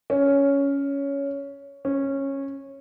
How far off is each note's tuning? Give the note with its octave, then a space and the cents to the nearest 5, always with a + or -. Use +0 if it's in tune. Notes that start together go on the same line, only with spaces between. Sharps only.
C#4 +10
C#4 -15